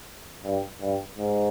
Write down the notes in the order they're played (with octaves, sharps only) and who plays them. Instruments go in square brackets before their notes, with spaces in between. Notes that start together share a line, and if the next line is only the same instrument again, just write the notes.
[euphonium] G2
G2
G#2